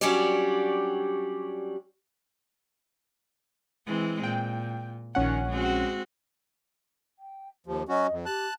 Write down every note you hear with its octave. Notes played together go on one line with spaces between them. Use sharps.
F#3 G3 C#4 D4 G4 D5
E3 G#3 C4
A#2 G5
A#1 A#2 D#3 C#4 F#5
G#3 C4 F#4
G5
D#2 F3 G4
F#3 C#4 F#4 D#5
F2
G4 A5 F#6